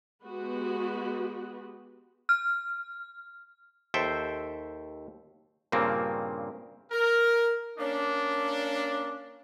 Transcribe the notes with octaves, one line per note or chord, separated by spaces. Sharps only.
G#3 B3 F#4 G4 B4
F6
D#2 A4 C5 E5 G5
G2 A#2 C#3 A#3 C4
A#4
A#3 C#4 D4